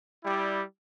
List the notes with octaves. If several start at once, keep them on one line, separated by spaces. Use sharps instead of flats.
G3 E4 G4 D5